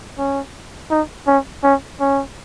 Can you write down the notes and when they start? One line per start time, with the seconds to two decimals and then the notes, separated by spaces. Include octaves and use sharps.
0.19 C#4
0.91 D#4
1.27 C#4
1.64 C#4
2.00 C#4